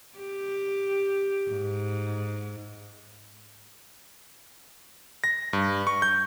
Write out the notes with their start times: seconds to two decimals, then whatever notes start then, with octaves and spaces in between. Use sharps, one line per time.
0.18 G4
1.51 G#2
5.24 A#6
5.53 G2
5.87 C#6
6.02 G6